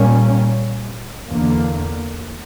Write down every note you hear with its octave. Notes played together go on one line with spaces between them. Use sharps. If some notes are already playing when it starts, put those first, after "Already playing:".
Already playing: A#2 G3 A#3 C#4
E2 D3 A#3